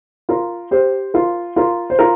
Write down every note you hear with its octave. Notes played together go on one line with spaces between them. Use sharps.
F4 A#4
G4 C5
F4 A#4
F4 A#4
C5
F4 A#4